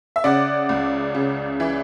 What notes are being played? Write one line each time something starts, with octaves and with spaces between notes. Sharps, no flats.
E5
C#3 D5 F#5
C#2
C#3
E3